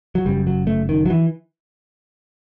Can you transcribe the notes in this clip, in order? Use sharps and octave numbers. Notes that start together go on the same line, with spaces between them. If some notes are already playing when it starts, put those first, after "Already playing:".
F#3
F#1 F#2 G3
F#3
A3
D#3
F#3
E3